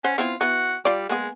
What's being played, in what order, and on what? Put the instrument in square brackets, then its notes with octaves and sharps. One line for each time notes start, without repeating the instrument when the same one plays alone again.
[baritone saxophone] C#4 [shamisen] B4 C5 F#5
[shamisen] B3 C4 E4 [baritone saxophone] F4
[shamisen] E3 B3 [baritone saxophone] F#4
[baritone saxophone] G3 [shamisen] F4 D5
[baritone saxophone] G#3 [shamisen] A#3 B3 G#4